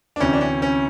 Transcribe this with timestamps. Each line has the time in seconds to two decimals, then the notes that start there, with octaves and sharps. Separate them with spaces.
0.16 D4
0.20 D2 C3 E3 C#4
0.33 D4
0.41 C#4
0.62 C#4